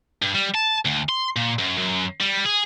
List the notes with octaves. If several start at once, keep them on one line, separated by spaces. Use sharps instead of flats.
G2
G3
A5
D2
C6
A#2
F#2
F#2
G3
G#4